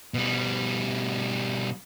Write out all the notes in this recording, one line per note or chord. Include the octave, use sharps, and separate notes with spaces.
B2 G3